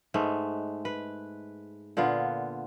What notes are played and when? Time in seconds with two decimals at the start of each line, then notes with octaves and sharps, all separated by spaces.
0.14 G#2 G#3 A3 B4
0.85 B4
1.97 A#2 D3 B3 F4